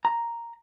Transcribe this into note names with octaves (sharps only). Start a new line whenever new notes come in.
A#5